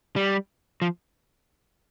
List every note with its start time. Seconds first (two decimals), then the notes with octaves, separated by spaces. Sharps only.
0.16 G3
0.82 F3